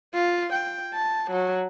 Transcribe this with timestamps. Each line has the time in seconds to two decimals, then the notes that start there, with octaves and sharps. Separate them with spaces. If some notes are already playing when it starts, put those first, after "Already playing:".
0.14 F4
0.53 G5
0.94 A5
1.31 F#3